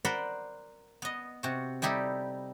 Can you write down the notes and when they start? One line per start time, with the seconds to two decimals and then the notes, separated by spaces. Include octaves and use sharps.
0.05 A#4 C5 D5 F#5 B5 C6
1.02 B3 D#5
1.43 C3 F#4
1.82 G3 D#4 E4 G4 A4